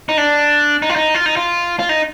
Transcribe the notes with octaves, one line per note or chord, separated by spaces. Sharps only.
D#4
D4
D#4
F4
D#4
F4
D#4
F4
F4
D#4